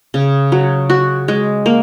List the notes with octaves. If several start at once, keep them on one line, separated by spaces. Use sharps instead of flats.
C#3
F#3
F#4
G#3
A#3